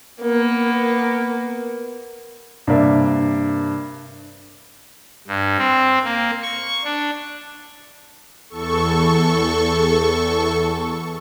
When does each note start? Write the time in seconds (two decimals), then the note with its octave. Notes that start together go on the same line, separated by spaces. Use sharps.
0.21 A#3 B3
2.67 G2 C3 A#3 D5 E5
5.28 G2
5.58 C4
6.05 A#3
6.43 C#6
6.84 D4
8.49 E2 A4 C#6